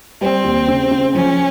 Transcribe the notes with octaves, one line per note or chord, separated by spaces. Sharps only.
G3 C4
D#2
C#3
C#3
F3 C#4